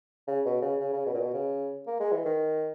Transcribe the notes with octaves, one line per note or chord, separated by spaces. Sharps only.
C#3
B2
C#3
C#3
C#3
B2
A#2
B2
C#3
A#3
G#3
E3
D#3